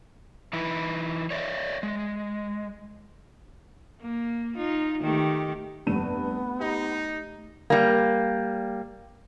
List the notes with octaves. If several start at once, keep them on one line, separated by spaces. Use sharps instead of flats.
E3 D#4 E4 B4
C#5 D5 E5
G#3
A#3
D#4 F4
D#3 A3 G4
F1 G2 A3 B3 D#7
D#4 G4
G3 A#3